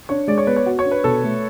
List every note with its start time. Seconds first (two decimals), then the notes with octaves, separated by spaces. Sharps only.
0.09 D4 C#5
0.28 G#3 D5
0.38 C#5
0.47 B3 B4
0.56 C#5
0.66 F#4
0.79 C#5
0.85 D4
0.92 B4
1.04 B2 A4
1.24 A3